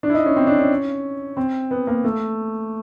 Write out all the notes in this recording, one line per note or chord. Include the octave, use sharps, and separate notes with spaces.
D4
E4
D#4
C#4
C4
D4
C#4
C4
B3
A#3
A3